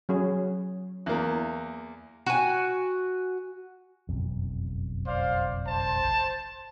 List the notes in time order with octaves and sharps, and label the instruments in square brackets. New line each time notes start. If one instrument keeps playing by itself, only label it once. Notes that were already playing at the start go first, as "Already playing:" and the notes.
[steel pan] F#3 C#4 G#4
[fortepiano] E2 A#3
[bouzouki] F#4 G#5
[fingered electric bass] F#1 B1 F2
[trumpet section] C5 D5 F5
C5 A5